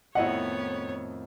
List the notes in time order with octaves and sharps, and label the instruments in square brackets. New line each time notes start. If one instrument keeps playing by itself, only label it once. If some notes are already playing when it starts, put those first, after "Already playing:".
[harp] F2 A2 D#3 [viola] B3 C#5 [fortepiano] E4 D#5 F#5